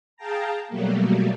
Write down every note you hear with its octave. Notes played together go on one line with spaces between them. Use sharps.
G#4 F5 G5 A5 A#5
B2 F#3 G3 A3 A#3